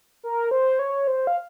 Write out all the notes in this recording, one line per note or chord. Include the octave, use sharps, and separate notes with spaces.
A#4
C5
C#5
C5
F5